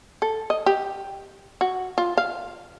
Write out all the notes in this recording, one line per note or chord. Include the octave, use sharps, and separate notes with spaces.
A4
D#5
G4
F#4
F4
F5